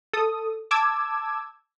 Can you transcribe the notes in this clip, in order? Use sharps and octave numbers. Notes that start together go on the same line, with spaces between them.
A4 D#6
A5 D6 E6 G#6